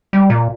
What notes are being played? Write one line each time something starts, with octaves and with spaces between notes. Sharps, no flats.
G3
A#2